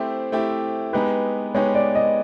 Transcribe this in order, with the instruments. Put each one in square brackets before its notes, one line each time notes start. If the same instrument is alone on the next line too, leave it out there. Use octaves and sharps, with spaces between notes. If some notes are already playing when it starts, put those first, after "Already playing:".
Already playing: [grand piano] A3 C4 E4 G4 [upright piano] C5
[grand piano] A3 C4 E4 G4
[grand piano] G#3 B3 D#4 G4 [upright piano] B4
[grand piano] G#3 B3 D#4 G4 [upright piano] C#5
[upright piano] D5
D#5